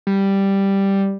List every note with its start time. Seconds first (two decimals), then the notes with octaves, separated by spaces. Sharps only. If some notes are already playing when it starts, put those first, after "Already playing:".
0.07 G3